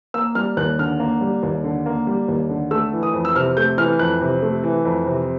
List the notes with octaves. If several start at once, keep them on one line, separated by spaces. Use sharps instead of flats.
A#3 E6
G3 F6
D#2 F#6
D3 F6
A#3
G3
D#2
D3
A#3
G3
D#2
D3
A3 E6
E3
D#6
F2
E6
C3 F6
A3 G6
E3 F6
F2 F#6
C3
A3
E3
F2
C3